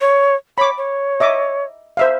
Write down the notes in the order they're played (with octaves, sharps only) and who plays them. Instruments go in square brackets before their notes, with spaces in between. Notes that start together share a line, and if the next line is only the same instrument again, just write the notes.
[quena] C#5
[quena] C#5 [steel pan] B5 D6
[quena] C#5
[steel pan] D#5 E5 D6
C5 E5 F5